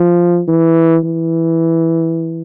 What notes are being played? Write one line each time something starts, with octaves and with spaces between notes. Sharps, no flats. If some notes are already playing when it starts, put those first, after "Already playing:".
Already playing: F3
E3
E3